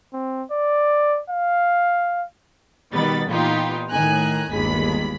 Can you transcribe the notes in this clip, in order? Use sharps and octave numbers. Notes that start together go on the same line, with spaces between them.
C4
D5
F5
B2 D#3 G3 B3 B5 A6
A#2 E3 B3 D#4 F4 G4
A2 D#3 G#5 A#5 F#6
G1 D#2 G#3 B5 B6